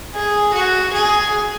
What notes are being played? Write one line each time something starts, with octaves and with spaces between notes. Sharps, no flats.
G#4
F#4
G#4